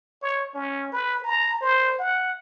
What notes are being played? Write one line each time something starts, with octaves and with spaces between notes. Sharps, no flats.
C#5
C#4
B4
A#5
C5
F#5